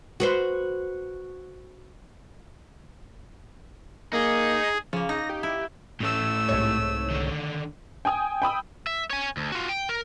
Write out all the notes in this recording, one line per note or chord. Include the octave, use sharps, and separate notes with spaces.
F#4 B4 C5
A#3 D#4 G#4
C#3 F3 A#3
D#4 A#6
G4
E4
A2 A3 C#4 E6
C2 G#2 C#5
D3 D#3
G5 G#5 D#6
G5 B5 D#6 E6
E5
C#5 G#5
D2
F4 F#4
G5
A#4